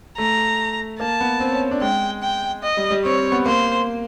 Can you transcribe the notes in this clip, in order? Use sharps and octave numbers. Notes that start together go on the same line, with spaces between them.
A3 A#5
A#3 A5
B3
C4
C#4
D4
G#3 G5
G5
D#5
G3
G3
C4 C#5
C4
B3
A#3 C5